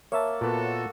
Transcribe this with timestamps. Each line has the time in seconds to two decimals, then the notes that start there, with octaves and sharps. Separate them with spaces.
0.12 A#3 C#5 E5 A5
0.41 A#2 B3 F#4 A4